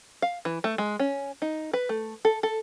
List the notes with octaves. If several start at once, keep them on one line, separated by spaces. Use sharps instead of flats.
F5
E3
A3
G#3
C#4
D#4
B4
A3
A4
A4